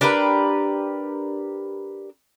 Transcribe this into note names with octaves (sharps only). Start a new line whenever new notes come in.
D4 G4 A#4 B4